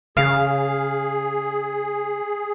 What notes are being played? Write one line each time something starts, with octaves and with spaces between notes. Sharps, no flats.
C#3 G#4 F5